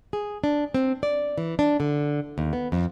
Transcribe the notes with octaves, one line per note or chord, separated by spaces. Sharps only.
G#4
D4
C4
D5
E3
D4
D3
D#2
B3
F2